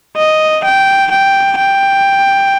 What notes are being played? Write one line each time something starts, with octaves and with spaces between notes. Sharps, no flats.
D#5
G5
G5
G5